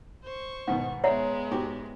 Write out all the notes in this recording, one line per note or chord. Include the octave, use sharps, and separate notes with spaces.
C5 C#6
G#2 B2 D#3 F#5
G#3 B3 C#5 E5 F#5 A#5
G#2 F#4 G4